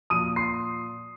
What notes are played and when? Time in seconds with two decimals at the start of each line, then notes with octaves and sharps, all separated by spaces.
0.10 A#2 F3 D#6 D#7
0.36 C6 C7